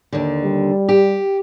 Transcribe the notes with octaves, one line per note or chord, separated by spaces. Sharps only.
D#2 D3
G3
G4